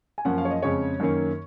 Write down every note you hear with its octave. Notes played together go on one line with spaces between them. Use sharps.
G#5
F#2 F3 A#3 C#4 F#5
F5
C#5
D#5
F2 C#3 G#3 C#4 C#5
F#2 D#3 A#3 C#4